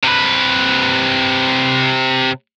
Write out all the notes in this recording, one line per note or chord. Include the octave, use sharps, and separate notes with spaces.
C3 B4